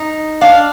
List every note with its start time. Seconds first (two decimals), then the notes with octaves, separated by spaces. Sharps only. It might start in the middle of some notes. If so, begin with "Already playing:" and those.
Already playing: D#4
0.41 D4 F5